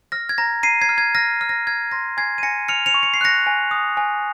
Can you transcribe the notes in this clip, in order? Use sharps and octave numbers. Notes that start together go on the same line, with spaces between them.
F6 A#6
G#6
A#5 A#6
A#5 C7 D#7
G#6 C7
F6
G#6
F6 A#6
F6
A#6
F6 G#6
C6 A#6
G#5 G#6 C7
D#7
G#5 A#6 C#7
F6 C#7 F7
C#7 F7
C#6
C#7
C7
F#6 A#6 C#7
G#5
D#6
G#5